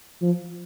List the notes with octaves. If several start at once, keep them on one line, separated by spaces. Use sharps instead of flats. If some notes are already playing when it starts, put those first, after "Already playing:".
F3